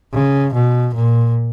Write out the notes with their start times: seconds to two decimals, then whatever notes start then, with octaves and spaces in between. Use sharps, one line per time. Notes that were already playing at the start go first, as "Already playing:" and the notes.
0.13 C#3
0.54 B2
0.95 A#2